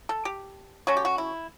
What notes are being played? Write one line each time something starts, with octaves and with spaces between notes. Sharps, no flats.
A4
G4
F#3 A3 C#4 F#4
G4
F#4
E4